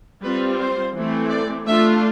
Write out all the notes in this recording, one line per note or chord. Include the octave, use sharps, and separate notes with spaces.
G3 C4 F4 B4
C5
E3 A3 C4
D5
A3 D4 F4 E5